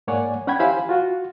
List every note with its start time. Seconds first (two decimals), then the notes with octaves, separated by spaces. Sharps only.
0.07 G#2 A#3 C#5 D5 F#5 G#5
0.47 C#4 F#5 G5 B5 G#6
0.59 E4 G4 C5 F5 G#5 B5
0.89 F4 F#4